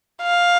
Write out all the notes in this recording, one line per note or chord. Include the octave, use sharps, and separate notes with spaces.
F5